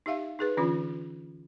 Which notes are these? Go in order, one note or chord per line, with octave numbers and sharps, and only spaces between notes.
D#4 G4 E5 F5
D#4 G#4 B4
D3 E3 C#4 D4 F4